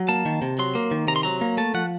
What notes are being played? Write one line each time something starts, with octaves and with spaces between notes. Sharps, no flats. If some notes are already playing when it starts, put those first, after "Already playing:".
Already playing: F#3
A#3 A5
D#3
C3
F#3 C6
A#3
D#3
C3 A#5
C6
F#3 A#5
A#3
A3 A5
F3 F#5